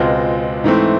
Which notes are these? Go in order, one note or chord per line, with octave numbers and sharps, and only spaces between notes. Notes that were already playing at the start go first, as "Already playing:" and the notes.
Already playing: C#2 B2 G#3 C4 F4
G#2 E3 A3 C4